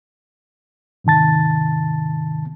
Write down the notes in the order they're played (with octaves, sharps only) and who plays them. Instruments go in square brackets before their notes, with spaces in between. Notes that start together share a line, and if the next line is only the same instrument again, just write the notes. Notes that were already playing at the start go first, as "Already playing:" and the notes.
[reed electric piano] G#2 C3 D#3 A5 A6